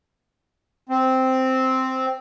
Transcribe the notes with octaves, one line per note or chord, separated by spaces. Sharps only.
C4